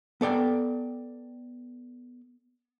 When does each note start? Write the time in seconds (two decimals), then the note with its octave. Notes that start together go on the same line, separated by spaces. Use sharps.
0.21 B3 A4 D5 G5